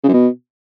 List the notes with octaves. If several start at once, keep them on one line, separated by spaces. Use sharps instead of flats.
C#3
F#2
B2